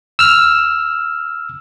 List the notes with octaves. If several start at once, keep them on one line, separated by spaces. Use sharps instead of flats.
E6 F6